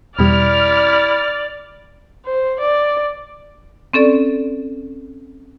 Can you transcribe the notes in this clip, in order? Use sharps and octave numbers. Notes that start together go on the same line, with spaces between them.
E2 B2 G3 E4 D5 F6
C5
D5
C4 C#4 A4 D5